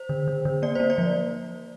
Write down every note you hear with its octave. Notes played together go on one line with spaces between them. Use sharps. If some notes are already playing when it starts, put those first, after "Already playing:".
Already playing: C5
D3
D3
D3
A#3 D5
A#3 C5
D5
F3